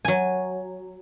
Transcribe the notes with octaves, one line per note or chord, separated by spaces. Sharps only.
F#3 G#5